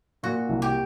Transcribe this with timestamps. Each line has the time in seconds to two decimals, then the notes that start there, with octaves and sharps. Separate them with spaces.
0.23 A#2 F#4
0.49 C2
0.62 G4